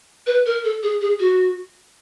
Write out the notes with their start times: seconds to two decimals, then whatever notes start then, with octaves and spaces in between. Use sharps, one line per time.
0.27 B4
0.46 A#4
0.64 A4
0.83 G#4
1.01 G#4
1.20 F#4